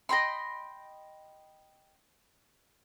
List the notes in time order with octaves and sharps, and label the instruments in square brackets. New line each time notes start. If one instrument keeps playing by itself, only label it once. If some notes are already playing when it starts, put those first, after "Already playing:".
[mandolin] D#5 G5 B5 C6